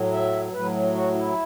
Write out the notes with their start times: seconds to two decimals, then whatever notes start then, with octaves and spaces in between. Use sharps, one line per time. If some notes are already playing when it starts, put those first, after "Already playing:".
Already playing: A2 F#3
0.12 E5
0.53 A2 F#3 B4
0.94 F#4
1.14 E4